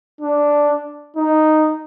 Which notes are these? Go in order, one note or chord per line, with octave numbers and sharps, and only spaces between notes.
D4
D#4